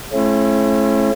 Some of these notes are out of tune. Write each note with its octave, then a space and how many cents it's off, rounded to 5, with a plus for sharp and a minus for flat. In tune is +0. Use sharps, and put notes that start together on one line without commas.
A3 -40 C#4 -35 E4 +30